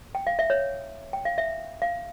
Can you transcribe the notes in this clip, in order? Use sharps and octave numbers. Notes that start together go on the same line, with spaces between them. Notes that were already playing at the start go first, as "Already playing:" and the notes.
G5
F5
E5
C#5
G5
F5
E5
F5